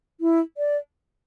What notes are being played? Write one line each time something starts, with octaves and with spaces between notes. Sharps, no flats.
E4
D5